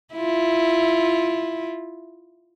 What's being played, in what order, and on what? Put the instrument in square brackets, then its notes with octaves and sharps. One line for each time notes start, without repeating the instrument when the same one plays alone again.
[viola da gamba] E4 F4